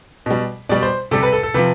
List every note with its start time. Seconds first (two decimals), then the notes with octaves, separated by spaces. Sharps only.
0.26 B2 G3
0.69 B2 G3 D5
0.83 C5
1.11 C3 G3 A4
1.23 B4
1.33 A4
1.43 A4
1.54 C3 F3 B4